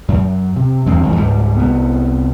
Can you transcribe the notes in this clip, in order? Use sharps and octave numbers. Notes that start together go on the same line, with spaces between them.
F#2
C3
E2 G2 G#3 C4
G1 F2 E3
C#2 G#2 G3
C2 B3